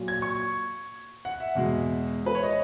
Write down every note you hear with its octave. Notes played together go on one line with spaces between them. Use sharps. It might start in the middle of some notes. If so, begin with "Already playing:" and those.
Already playing: A#2 F#3
G#6
C#6
F#5
E5
E2 B2 G#3
B4
C#5
D#5